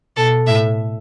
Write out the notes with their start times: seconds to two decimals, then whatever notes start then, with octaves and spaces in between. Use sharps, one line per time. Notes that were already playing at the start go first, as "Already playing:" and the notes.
0.17 B2 A4
0.47 A2 E5